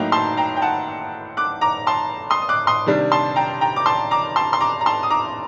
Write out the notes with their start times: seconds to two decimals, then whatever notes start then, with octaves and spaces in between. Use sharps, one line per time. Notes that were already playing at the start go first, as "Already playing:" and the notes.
Already playing: A2 F#3 A#3 D#4 G5 A#5
0.12 A5 C6
0.37 G5 A#5
0.57 G5
0.62 F#5 A5
1.37 D6 F#6
1.61 A#5 D6
1.87 A5 C6
2.30 C6 D#6
2.42 D#6
2.49 D6 F#6
2.67 C6 D#6
2.86 C3 D#3 G3 D4
3.11 A5 C6
3.36 G5 A#5
3.61 G5 A#5
3.76 D6
3.86 A5 C6
4.11 A#5 D6
4.36 A5 C6
4.53 C6
4.60 A#5 D6
4.81 A#5
4.86 A5 C6
5.03 D#6
5.10 A#5 D6